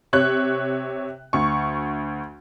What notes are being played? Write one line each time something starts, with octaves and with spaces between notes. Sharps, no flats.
C3 C#5 F#6
D2 C#6